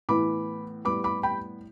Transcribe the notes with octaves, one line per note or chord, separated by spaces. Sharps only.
A2 E3 B3 B5 D6
A2 G3 B3 B5 D6
B5 D6
G5 B5